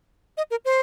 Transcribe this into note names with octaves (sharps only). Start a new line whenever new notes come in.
D#5
A#4
C5